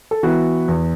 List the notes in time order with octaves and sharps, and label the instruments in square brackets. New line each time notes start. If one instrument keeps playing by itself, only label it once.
[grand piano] A4
E3 B3 E4 F#4
E2